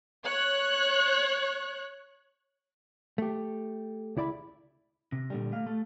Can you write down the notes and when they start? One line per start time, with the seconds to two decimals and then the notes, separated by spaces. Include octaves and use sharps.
0.24 C#5 F#6
3.18 A3 G4
4.17 C#2 E4 D5 E5 B5
5.12 C3
5.30 A#2 D3 G3
5.52 A3 F5
5.66 A3 A4